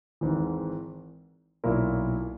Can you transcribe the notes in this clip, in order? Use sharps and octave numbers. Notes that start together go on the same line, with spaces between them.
G#1 G#2 E3
B1 A#2 A#3 E4 A#4